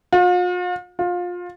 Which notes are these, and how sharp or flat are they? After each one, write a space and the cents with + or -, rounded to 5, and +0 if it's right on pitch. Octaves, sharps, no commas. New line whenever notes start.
F4 +45
F4 +25